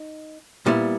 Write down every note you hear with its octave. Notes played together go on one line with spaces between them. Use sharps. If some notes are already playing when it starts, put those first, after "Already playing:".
Already playing: D#4
A#2 G3 B3 E4